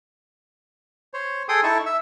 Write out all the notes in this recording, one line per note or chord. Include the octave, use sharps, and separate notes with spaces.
C5 C#5
G#4 A4 G5 C6 D#6
D#4 E4 A4 A5 C#6
E5 E6